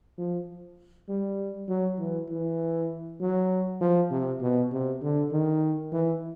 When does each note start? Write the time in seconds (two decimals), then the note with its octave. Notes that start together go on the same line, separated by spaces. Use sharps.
0.18 F3
1.09 G3
1.69 F#3
1.99 E3
2.29 E3
3.21 F#3
3.81 F3
4.11 C3
4.41 B2
4.71 C3
5.02 D3
5.32 D#3
5.92 E3